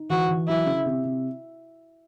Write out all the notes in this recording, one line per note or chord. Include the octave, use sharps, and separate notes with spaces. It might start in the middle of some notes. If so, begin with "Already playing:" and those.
Already playing: D#4
E3 F#4
E3
F#3 E4
C#3
C3
C3